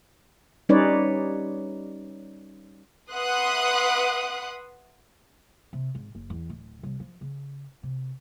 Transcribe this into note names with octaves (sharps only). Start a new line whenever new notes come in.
G3 C#4 D#4 B4 C#5 D5
B4 E5 F#5 C6 D#6 F#6
C3
G#1
F#1
E2
D1
C2
F3
C#3
C3